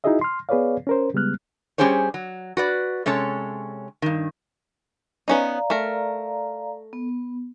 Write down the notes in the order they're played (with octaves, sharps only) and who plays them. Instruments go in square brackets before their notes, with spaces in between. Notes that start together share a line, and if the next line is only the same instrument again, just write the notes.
[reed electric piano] D#4 E4 F#4 G#4 D#5 E5
C6 F6
B3 G#4 B4 C#5 D5 F5
C#4 A#4 C5
C#3 G3 G#3 B3 F6 F#6
[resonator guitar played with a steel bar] G3 C#4 G4 G#4 C5 C#5
F#3
F#4 B4 D5
C3 G#3 C#4 A4 C#5
G2 D#3
[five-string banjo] B3 C#4 D#4 [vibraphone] D5 F5 A#5
[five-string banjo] A3 A#4
[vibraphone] B3